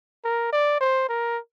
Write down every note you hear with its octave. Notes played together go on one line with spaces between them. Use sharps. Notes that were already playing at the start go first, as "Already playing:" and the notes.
A#4
D5
C5
A#4